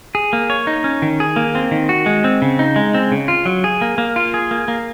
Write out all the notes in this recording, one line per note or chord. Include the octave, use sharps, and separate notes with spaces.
G#4
A#3
C#5
D#4
C#4
D#3
G#4
A#3
C4
D#3
F#4
G#3
C4
C#3
D#4
G#3
C4
C#3
F4
F#3
G#4
A#3
A#3
F4
G#4
A#3
A#3